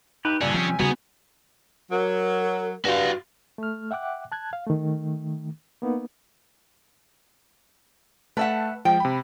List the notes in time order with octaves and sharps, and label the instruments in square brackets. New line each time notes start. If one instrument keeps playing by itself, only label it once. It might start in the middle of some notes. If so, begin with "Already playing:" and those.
[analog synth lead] D#4 [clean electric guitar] G4 B4
[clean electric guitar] G2 A#2 D3 [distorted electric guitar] C#4 G#4 [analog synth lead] D5
[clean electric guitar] C3 G3 [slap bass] F3 [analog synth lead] G#5
[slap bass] C#3 G3 [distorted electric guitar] B3 [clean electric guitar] D#4 G#4 [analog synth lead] F#4
[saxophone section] F#3 [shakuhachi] A#4
[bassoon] G2 [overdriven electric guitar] F#4 F5
[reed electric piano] A3 F6
E5 F#5 G5 D6 F#6
A5 F#6 G#6
F5
D#3 A3
A#3 B3 D#4
[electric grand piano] A3 A5 [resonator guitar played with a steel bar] B4 E5 F#5
[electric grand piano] F3 G#3 [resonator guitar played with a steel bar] G5
[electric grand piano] C3 B5